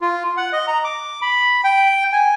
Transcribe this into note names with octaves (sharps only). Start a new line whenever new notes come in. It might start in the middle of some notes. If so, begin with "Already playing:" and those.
F4
F#5
D#5
A#5
D6
B5
G5
G#5